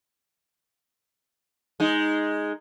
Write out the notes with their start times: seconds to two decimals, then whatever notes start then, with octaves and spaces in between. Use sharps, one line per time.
1.80 G#3 D#4